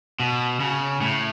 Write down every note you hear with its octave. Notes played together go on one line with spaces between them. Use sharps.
B2
C#3
A2